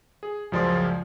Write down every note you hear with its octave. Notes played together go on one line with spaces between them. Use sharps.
G#4
C#2 F#2 F3 G#4 D5 C6